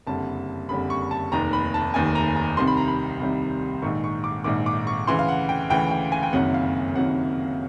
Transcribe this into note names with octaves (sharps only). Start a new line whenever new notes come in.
F#1 F2 D3 G3 A5
F#1 F2 D3 G3 B5
C#6
A5
F1 D#2 D#3 A#5
B5
A5
F1 D#2 D#3 G#5
A#5
A#5
C2 C3 D#3 G3 C6
B5
A#5
B5
C2 C3 D#3 G3
A#1 G#2 D#3 C#6
C#6
D6
A#1 G#2 D#3 D6
D6
C#6
D2 C#3 E3 C6
F5
F#5
G5
D2 C#3 E3 G5
G5
G#5
G5
F#1 F2 C3 D#3 F#3 F#5
F5
F#1 F2 C3 D#3 F#3 F#5